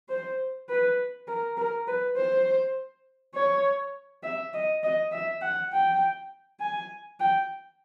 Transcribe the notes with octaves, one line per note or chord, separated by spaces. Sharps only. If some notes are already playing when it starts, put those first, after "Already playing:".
C5
B4
A#4
A#4
B4
C5
C#5
E5
D#5
D#5
E5
F#5
G5
G#5
G5